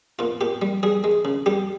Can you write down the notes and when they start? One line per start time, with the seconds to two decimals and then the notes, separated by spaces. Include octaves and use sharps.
0.19 A#2 F4
0.41 A#2 G4
0.62 G3
0.83 G3 G#4
1.04 G#3
1.25 C#3
1.46 G3 G4